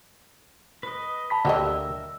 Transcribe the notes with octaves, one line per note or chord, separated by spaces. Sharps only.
B4 D#5
A5 B5 B6
D2 D3 D4 G4 A#4 D#5 E5 E6